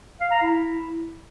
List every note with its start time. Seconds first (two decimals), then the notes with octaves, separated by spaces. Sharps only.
0.21 F5
0.31 A#5
0.42 E4